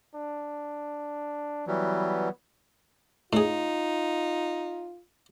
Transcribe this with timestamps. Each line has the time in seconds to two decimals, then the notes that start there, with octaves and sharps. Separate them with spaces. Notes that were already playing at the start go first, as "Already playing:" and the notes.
0.15 D4
1.67 E3 F#3 G3 B3
3.33 A2 D#4 F4 G#4